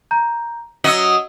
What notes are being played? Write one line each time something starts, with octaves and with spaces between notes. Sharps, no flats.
A#5 G6
F#3 D#5 E6 C#7 F#7